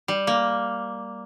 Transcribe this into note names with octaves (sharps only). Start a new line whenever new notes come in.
G3
A#3